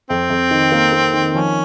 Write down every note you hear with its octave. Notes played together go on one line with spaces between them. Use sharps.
F2 C4
F2
D#3
A#3
A#3
D#3
F3 C#4